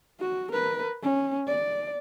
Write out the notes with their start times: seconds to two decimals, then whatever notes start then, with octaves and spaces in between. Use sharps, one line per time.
0.20 F#4
0.52 A#4 B4
1.03 C#4
1.47 D5